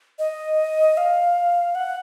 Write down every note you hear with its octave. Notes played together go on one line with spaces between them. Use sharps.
D#5
F5
F#5